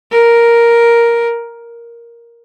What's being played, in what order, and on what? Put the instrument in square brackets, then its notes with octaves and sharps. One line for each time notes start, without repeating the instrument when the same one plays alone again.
[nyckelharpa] A#4